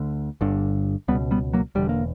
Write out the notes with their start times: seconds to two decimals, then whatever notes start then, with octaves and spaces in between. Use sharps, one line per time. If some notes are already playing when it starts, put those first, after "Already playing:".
Already playing: D2 D3
0.41 G1 G2 D3
1.08 C#2 B2 G3 B3
1.31 G3 B3
1.53 F#3 A#3
1.75 E1 E2 D3 G3
1.89 A#3